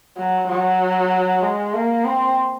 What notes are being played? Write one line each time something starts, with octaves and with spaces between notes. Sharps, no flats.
F#3
F#3
G#3
A#3
C4